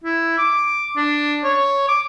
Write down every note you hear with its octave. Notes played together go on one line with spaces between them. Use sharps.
E4
D6
D4
C#5
D6